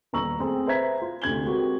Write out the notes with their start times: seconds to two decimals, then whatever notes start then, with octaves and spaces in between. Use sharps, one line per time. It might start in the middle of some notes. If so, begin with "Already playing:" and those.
0.13 D#1 B3 A#5 C#6 E6 F#7
0.40 A3 C4 G#4 A4
0.66 B4 C5 E5 A#5 G#6 B6
1.02 F4
1.22 D2 C3 G#6 F#7 G7
1.45 G#3 C4 F#4 G4 A#4